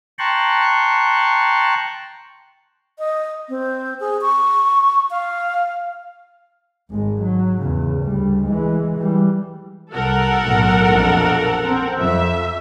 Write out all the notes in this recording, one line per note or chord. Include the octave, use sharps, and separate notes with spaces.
G5 A5 A#5 C6 C#6 F#6
D#5
C4
G#4
C#6
F5
G#1 G#3
F#3
E2 C#3
D2 G3
E3 G#3
E3 G3
C2 A4 A#4 F#5
B1 A2
A#1 F2 B2
C4
F2 E5